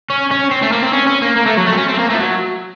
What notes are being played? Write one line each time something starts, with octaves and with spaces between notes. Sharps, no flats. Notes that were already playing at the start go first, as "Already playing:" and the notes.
C#4
C#4
C4
A3
A#3
C4
C#4
C#4
A#3
A#3
A3
F#3
A3
C4
C#4
C4
A3
A#3
A3
F3
F#3